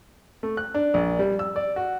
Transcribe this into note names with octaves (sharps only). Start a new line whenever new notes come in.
A3
F#6
D4
A#1
G3
E6
D5
F#4